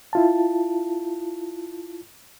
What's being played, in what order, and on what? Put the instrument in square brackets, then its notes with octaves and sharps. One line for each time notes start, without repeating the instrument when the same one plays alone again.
[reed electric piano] E4 F4 A5